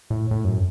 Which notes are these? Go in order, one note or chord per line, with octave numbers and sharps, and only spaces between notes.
A2
A2
F#2